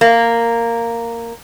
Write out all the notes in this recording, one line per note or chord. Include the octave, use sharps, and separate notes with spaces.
A#3